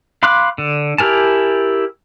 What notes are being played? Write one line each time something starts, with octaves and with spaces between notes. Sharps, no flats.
F5 B5 C6 D6 F#6
D3
E4 G4 A#4 G#5 A5